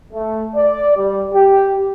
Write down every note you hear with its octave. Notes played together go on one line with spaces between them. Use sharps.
A3
D5
G3
G4